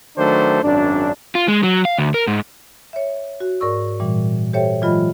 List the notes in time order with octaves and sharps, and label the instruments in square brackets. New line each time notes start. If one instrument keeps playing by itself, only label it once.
[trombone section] D#3 F#3 A3 D4 C5
G#1 F#2 D4
[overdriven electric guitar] F4
G#3
F#3
F5
D2
A#4
G#2
[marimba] C#5 E5
F#4
G#2 A#4 D5 C#6 E6
A#2 E3 G3
G4 A4 C5 C#5 E5 G5
E3 F#3 G#3 F4 D#5 B5